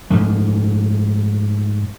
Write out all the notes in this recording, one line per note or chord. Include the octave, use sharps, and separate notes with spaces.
G#2 F3 A3